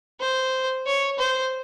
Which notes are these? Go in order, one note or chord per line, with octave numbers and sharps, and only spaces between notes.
C5
C#5
C5